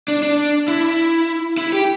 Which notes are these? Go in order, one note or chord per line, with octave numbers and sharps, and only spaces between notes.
D4
D4
E4
E4
G4